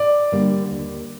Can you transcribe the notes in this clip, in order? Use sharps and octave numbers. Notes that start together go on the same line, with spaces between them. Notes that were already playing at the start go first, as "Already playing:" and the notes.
Already playing: D5
D3 G3 A#3
D#2